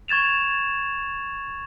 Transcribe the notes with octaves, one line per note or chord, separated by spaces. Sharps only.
C#6 G#6 A6 E7 F7